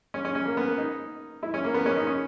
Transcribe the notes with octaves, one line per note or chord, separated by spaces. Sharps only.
C#4
C#4
C#4
A#3
B3
D#4
E4
C#4
A#3
B3
C#4
D#4
C#4